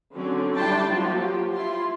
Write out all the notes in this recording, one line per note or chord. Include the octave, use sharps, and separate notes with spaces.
D3 F#3 C4 C#4
G3 D4 E4 G5 A5 C6
F3 F#3 A#3
G4
E4 F4 C6